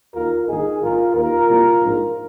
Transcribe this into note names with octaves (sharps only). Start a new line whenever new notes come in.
D#2 D#3 F4 A#4
A#1 G#2 D#3 D#4 G#4
A#1 G#2 D#3 F4 A#4
D#2 D#3 F4 A#4
C2 A#2 F3
A#1 G#2 F3